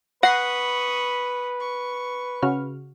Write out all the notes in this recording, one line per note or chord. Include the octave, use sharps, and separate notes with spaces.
B4 F#5 B5 C#6 D#6 A#6 C7
C#6
C#3 F#4 F6